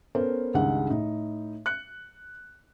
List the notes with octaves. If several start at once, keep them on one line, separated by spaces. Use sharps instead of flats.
B3 C#4 A4 A#4 C5
C#2 G2 D#3 G#3 F#5
A2 D#4
F#6 C#7